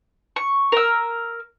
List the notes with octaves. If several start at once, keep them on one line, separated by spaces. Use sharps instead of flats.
C#6
A#4 E6